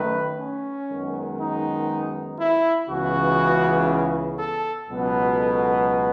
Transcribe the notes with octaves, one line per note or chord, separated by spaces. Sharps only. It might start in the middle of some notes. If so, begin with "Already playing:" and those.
Already playing: F#2 D#3 A3 B4
C#4
F#2 D#3 G#3 B3
D#4
E4
C#2 C#3 E3 B3 F#4
A4
C#2 B2 F#3 B3
A4